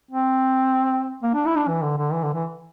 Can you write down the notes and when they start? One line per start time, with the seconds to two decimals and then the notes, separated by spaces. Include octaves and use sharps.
0.11 C4
1.23 A#3
1.34 D4
1.46 E4
1.56 D4
1.68 E3
1.82 D3
1.97 D3
2.13 E3
2.24 D3
2.34 E3